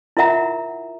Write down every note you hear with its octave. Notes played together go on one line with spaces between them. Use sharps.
E4 F4 A#4 E5 F#5 A#5